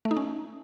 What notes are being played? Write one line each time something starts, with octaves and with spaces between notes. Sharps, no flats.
A3
D#4
C#4